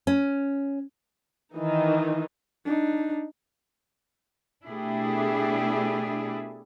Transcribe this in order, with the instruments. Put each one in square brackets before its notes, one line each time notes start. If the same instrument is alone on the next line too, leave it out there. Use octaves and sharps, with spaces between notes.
[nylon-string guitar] C#4
[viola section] D#3 E3 D#4
[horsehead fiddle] D4 D#4
[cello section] B2 A3 D4 E4 G4 G#4